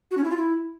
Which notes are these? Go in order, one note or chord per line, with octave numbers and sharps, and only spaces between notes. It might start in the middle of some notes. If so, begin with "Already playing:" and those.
F#4
C#4
E4
F4
E4